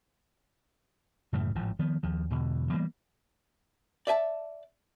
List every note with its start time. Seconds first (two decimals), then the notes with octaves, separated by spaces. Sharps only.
1.33 F#2 A2 C#3 E3
1.55 G#1 A2 F3
1.79 D#3 F3 B3
2.03 D#2 F3
2.30 E2 B2 D3
2.70 E3 G3 A#3 B3
4.07 D5 E5 G#5 A5